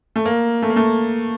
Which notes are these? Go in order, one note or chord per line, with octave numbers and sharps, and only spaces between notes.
A3
A#3
A3
A#3
A3